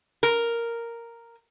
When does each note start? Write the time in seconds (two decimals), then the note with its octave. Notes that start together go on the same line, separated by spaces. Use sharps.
0.23 A#4